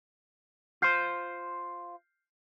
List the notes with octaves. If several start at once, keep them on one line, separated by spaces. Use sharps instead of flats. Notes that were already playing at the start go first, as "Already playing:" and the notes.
F4 C5 F6 G6 C7